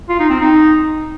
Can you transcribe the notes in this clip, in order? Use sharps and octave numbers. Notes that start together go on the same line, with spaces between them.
F4
D#4
C4
D#4